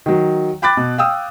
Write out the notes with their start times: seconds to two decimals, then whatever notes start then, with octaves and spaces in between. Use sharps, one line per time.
0.06 D#3 F#3
0.62 G5 B5 D6 F#6 A6
0.77 B2
0.98 F5 G5 D#6 E6